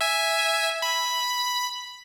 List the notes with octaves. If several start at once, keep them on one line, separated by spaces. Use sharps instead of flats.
E5 G#5
B5